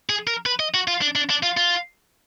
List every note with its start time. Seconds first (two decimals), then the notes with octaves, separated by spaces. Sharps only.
0.09 G#4
0.27 A#4
0.46 B4
0.60 D#5
0.74 F#4
0.88 F4
1.01 D4
1.15 D4
1.30 D4
1.43 F4
1.57 F4